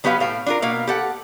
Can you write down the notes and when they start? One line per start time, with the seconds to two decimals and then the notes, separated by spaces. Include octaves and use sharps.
0.04 F#3 B3 G4 B4 C#5 F5
0.20 A2 F5 G5
0.46 D4 F4 A#4
0.62 B2 A#3 F5
0.87 G4 A4 F#5